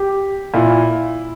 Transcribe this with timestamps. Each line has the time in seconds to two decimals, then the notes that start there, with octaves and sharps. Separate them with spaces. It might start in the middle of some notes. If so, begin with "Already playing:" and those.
Already playing: G4
0.54 A#2 E4